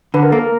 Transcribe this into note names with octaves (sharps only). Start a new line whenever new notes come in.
D3 B4
A#4
A#3 A4
A#4